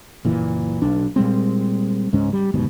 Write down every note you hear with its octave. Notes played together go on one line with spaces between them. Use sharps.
F#1 A#2 E3
B1 D4
A#2 G3 G#3 C4
C#2 G#2 G#3 C#4
G3
F#1 D2 G#2 B2